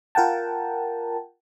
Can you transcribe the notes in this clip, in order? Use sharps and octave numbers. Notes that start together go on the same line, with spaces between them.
F4 A#4 F#5 G5 A5